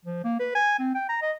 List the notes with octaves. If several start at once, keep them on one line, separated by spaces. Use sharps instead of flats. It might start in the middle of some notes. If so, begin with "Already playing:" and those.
F3
A#3
B4
G#5
C4
G5
A#5
D#5